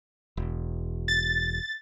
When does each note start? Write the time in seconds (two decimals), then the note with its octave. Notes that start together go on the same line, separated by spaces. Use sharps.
0.37 E1
1.08 A6